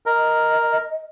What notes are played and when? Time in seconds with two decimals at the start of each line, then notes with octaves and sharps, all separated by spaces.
0.06 A#4 D#5